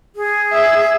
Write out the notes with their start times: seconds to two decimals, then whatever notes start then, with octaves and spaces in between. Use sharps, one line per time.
0.16 G#4
0.53 E5